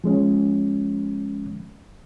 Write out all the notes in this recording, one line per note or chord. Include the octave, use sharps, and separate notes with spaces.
F3 G#3 C#4